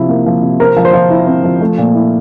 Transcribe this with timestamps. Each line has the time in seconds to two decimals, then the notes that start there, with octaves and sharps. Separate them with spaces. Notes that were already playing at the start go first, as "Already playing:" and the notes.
Already playing: C3 F3 E4
0.09 A#3
0.26 F3
0.42 C3
0.60 C4 A#4
0.77 F3
0.85 C5
0.94 F3
1.10 E4
1.27 C4
1.44 F3
1.61 A3
1.78 A#2
1.95 E4